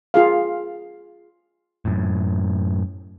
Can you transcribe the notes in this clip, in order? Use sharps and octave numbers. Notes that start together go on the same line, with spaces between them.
F4 G#4 F5
F#2 A2